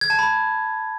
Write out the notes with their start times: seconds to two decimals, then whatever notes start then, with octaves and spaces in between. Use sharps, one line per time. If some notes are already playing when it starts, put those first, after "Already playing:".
0.01 G#6
0.10 A5
0.19 B5